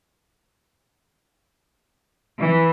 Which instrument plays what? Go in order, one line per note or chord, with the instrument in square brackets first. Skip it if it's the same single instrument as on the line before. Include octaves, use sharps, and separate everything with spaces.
[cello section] E3